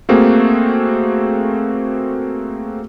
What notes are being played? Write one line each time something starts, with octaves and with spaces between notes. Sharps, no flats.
A3 A#3 C4 F#4 G#4